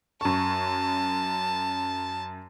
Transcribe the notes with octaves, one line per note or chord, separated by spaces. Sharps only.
F#2 A5 C#6